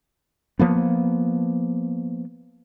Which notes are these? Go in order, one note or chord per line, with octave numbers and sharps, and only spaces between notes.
F3 A#3 B3